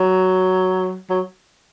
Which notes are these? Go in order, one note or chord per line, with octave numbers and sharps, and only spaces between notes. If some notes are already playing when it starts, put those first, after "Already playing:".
Already playing: F#3
F#3